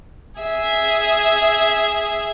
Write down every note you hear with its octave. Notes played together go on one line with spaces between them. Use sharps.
G#4 E5